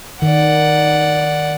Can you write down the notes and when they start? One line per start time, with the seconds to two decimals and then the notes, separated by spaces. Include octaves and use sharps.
0.22 D#3 D5 F#5